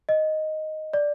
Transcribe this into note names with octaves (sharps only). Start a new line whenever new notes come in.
D#5
D5